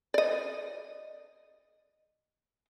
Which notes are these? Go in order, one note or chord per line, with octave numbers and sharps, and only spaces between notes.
D5 D#5